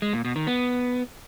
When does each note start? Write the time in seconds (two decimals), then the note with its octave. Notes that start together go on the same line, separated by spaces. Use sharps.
0.02 G#3
0.13 A#2
0.25 B2
0.36 D#3
0.47 B3